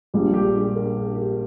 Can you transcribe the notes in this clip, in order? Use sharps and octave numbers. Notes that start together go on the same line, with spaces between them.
A#1 A#2 G3 G#4
G4
G#4
A#4
G#4
G4